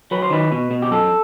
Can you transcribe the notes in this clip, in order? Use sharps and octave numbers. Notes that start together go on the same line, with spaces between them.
F#3 B4
C5
D#3 B4
B2
B2
G4
F#2 A4